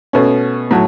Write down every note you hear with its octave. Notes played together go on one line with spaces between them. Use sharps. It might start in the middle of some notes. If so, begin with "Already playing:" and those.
B2 A3 C#4
A2 F#3